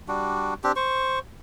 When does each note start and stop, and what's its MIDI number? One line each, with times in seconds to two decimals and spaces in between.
0.08 0.54 55
0.08 0.54 62
0.08 0.54 66
0.64 0.72 60
0.64 0.72 62
0.64 0.72 67
0.76 1.19 72
0.76 1.19 85